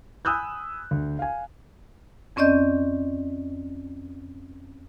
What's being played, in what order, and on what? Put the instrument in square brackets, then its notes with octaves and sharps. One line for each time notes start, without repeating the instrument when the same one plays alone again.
[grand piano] G#5 B5 D#6 E6 F#6 G6
D2
F5 G#5
[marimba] F2 C4 C#4 D5 D#5 G6